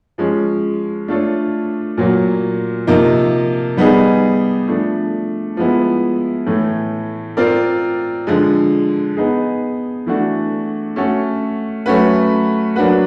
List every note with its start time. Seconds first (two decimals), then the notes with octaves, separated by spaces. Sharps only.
0.18 F3 G#3 C#4
1.08 A3 D4 F4 A4 C#5
1.97 A#2 F#3 A#3
2.87 C3 F3 A#3 D#4
3.77 G3 B3 D#4 G#4
4.68 F3 A3 D4
5.57 F3 G#3 B3 E4
6.46 A2 E3 A3
7.37 C4 F4 A#4 D5
8.27 D3 F3 G#3
9.17 B3 D#4 G#4
10.06 E3 A3 D4 F#4
10.96 A3 C#4 F#4 A4
11.86 F#3 A3 C#4 F#4 B4
12.76 F#3 A#3 D4 F#4 B4